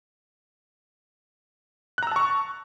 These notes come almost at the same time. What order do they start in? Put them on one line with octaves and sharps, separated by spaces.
F#6 A#5 E6 A5 C#6